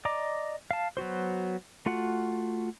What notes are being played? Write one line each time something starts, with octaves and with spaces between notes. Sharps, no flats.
D5 D#5 A#5 D6
F5 A5
F#3 B3 F#4 C5
A3 F4 F#4 F#5